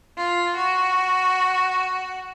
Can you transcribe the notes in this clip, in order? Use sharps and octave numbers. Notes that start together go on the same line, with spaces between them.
F4
F#4